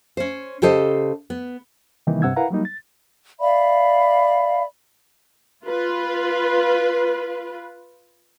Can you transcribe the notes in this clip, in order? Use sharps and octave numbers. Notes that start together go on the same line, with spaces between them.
C#4 C5
C#3 G4 A4 C5 D#5
B3
C3 D#3 E3 G3 A#3 D#4
G2 C3 F#5 E6 G#6
E4 A#4 B4 F5 F#5 A#5
F#3 G3 A#3 D#4
A6
D5 E5 F5 B5
F4 B4